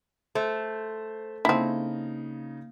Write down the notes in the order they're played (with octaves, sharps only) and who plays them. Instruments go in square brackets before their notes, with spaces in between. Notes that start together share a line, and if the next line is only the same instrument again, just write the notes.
[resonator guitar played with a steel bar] A3 [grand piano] C5
[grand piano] C#3 D#4 [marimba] A#3 A5 [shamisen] C4 E4